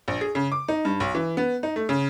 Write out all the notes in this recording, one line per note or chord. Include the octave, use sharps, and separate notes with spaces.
A#1
G#4
C#3
D6
D#4
G2
B1
E3
B3
D#4
A3
C#3